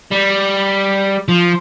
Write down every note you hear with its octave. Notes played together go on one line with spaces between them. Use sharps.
G3
F3